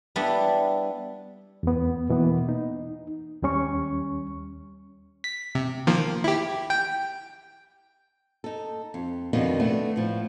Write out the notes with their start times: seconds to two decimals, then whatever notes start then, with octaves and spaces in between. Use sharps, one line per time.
0.16 G3 B3 D4 E4
1.63 E2 B3
2.10 B2 E3 A#3 B3
2.49 D#4
3.42 D#2 G3 C#4 C#6
5.24 B6
5.55 C3
5.87 D#3 F3 A#3
6.24 E4 G4
6.70 G5
8.44 D#4 A4
8.94 F2
9.33 F2 B2 D3 D#3 F3
9.60 A3 B3 D4
9.96 A2 F3